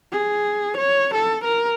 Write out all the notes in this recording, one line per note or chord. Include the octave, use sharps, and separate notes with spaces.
G#4
C#5
A4
A#4